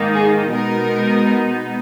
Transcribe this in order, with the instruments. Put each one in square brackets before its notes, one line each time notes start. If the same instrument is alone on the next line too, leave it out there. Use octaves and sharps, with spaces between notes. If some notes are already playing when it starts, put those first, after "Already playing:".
Already playing: [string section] G#2 D#3 A#3 D#4
G#4
B2 G#3 B3 D#4 A#4